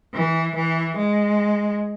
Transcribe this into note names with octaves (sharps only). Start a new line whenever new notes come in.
E3
E3
G#3